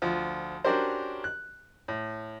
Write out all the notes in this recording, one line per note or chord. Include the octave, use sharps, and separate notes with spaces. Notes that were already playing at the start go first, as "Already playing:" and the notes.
D2 F3
C#4 D4 F#4 G4 A#4 C5
F#6
A2